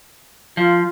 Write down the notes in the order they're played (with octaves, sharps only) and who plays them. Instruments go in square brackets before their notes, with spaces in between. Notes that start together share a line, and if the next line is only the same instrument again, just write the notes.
[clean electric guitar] F3 [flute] F4